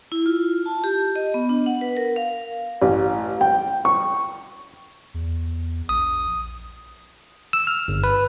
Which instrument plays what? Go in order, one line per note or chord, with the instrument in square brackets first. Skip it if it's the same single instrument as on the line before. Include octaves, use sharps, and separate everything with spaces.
[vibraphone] E4
F4
A5
G4
D#5
B3
D4
F#5
B4
A#4
F5
[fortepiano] A1
G5
C#6
[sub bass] E2
[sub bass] A#1 [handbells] D#6
[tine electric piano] E6
F6
G1
B4